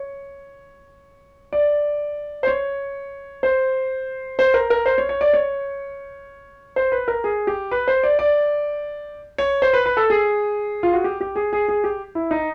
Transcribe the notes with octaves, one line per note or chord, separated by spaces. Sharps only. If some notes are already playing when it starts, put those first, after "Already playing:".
Already playing: C#5
D5
C5
C#5
C5
C5
A#4
A#4
C5
C#5
C#5
D5
C#5
C5
B4
A#4
G#4
G4
B4
C5
D5
D5
C#5
C5
B4
B4
A4
G#4
F4
F#4
G4
G4
G#4
G#4
G#4
G4
E4
D#4